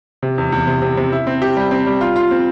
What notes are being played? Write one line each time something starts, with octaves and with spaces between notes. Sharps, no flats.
C3
E2
E2
C3
C3
C3
E4
C4
G4
G3
C4
G3
F4
F4
C4